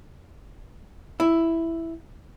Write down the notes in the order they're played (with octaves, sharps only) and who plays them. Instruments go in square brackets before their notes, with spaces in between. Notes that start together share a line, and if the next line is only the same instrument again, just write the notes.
[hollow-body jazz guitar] E4